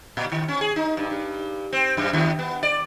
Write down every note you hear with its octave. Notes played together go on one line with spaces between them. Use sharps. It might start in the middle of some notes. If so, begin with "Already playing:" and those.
A#2
D#3
C#4
G#4
D#4
G2
G2
C4
F#2
D#2
B3
D5